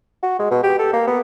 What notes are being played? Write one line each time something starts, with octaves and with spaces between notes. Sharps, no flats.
F#4
G#3
B2
G4
A4
A#3
B3